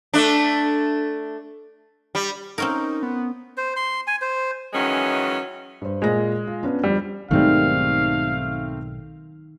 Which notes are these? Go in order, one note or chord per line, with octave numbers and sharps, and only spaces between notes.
A3 D4
G3
C4 C#4 D#4 A#4
B3
C5
C6
G#5
C5
D#3 E3 F#3 G#3 C#4
G2 C5
A#2 G#3 G#4 A#6
F4
B3 C#4 D4
F2 D3 G3
B1 G#2 D#3 G3 A3 C4 F5